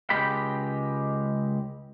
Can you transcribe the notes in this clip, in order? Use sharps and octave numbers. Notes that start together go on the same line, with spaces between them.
C#2 G#3 G4 G5 B5